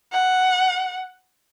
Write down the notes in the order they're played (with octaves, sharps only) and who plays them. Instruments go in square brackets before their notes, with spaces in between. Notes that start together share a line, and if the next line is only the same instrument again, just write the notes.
[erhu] F#5